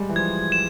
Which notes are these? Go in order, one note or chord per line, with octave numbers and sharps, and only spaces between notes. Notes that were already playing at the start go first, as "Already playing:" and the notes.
Already playing: G3 G#3
E3
F3 G#6
E7